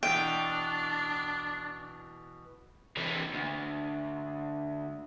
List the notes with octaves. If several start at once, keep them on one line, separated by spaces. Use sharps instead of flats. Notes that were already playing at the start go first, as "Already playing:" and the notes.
B2 E3 D4 G5
C3 E3
D2